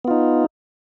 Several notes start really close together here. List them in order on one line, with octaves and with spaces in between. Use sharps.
B3 F4 D#4